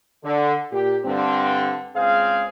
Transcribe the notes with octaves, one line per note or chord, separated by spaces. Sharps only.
D3
A#2 G4
G2 D3 C4
C#2 C4 G#4 F5